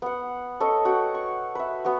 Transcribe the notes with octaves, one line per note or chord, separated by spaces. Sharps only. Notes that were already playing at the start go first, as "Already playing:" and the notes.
B3 F#5
A4 C#5 D#5
F#4 F#5 G5
C#6
B4 E5
B3 F#4